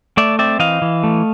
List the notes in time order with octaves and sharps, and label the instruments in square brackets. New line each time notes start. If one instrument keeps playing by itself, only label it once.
[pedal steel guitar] A3 D5 E5
C4 D5 E5
E3 D#5 F5
E3
A3